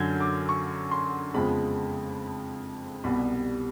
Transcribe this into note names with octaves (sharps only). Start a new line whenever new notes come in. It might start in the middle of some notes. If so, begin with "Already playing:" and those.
Already playing: F#2 D3 F#3 G6 G#6
D6
C#6
C6
F2 C#3 F3 G#3 B3 B5
C2 B2 G3 B3 B5